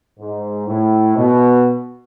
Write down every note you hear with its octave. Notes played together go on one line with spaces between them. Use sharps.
G#2
A2
B2